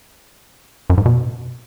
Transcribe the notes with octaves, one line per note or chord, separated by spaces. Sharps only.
F#2
G#2
B2